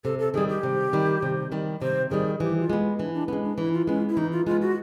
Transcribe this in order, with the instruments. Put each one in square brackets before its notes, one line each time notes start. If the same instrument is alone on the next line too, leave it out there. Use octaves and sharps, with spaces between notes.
[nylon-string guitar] C3 [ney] A4
[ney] A4
[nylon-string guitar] D#3 G3 [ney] G#4
[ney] G4
[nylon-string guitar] C3
D#3 G3
C3
D#3 G3
[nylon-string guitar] C3 [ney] C5
[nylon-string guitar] D#3 G3 [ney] G#4
[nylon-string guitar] E3 [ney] G4
[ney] F4
[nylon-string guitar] G#3 B3
[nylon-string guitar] E3 [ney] D4
[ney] D4
[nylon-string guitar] G#3 B3 [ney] C#4
[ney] D4
[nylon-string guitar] E3 [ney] E4
[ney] F4
[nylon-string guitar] G#3 B3 [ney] C#4
[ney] E4
[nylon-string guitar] E3 [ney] D#4
[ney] F4
[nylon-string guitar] G#3 B3 [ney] F4
[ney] F#4